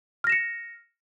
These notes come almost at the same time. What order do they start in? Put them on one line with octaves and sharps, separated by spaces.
F6 A#6 E7 C#7